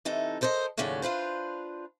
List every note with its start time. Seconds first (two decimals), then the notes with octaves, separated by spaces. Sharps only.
0.05 C3 E3 D#4 A4
0.41 A4 A#4 C5 D5 D#5
0.77 D#2 A2 C#3 F#3 C#4 D5
1.02 D4 F4 B4 C5